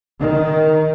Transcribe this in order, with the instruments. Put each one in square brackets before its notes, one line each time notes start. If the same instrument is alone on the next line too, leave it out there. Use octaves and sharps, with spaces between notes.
[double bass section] D#3